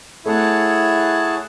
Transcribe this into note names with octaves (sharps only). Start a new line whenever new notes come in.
A3 E4 G#4 C#5 F#5 A5